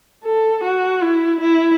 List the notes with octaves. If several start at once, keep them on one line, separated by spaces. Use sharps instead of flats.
A4
F#4
E4
E4